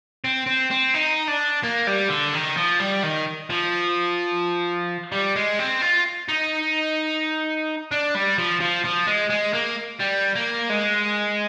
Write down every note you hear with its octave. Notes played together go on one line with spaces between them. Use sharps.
C4
C4
C4
D#4
D4
A#3
G3
D3
D#3
F3
G3
D#3
F3
G3
G#3
C4
F4
D#4
D4
G3
F3
F3
F3
G#3
G#3
A#3
G3
A#3
G#3